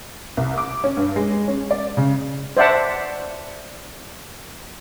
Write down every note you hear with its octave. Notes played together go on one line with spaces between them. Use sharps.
C2
D6
C#4
G2
G#3
C#4
D5
C#3
C5 D5 E5 F#5 A5